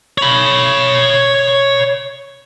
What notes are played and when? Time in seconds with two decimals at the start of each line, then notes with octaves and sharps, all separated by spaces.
0.18 C#5 B5